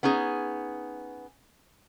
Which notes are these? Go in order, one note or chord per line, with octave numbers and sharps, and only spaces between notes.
B3 C#4 D#4 G#4